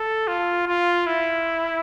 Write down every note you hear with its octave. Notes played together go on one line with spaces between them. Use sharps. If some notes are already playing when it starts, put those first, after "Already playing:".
Already playing: A4
F4
F4
E4